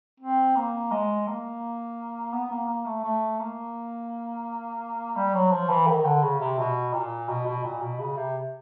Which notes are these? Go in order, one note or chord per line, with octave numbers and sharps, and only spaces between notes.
C4
A#3
G#3
A#3
B3
A#3
A#3
A3
A3
A#3
G3
F#3
F3
E3
D#3
D3
C#3
C3
B2
A#2
B2
B2
A#2
B2
C#3
C3